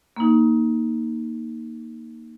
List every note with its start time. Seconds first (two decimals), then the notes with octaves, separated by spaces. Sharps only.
0.16 A#3 D#4